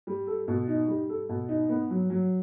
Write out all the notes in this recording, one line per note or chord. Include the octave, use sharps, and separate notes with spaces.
G3
A4
B2
D#4
G3
A4
B2
D#4
B3
F#3
F#3